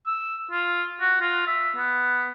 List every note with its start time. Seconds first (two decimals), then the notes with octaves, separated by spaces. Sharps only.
0.07 E6
0.51 F4
1.01 F#4
1.21 F4
1.47 E5
1.76 B3